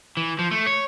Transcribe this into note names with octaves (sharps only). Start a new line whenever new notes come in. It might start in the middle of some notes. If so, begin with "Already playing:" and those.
E3
F3
A3
C#5